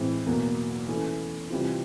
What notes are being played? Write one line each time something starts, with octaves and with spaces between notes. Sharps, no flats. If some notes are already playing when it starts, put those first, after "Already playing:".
Already playing: A2 E3 G#3 C4
E2 B2 F#3 A#3
E3 A3 C#4
C3 E3 G3 C4 F4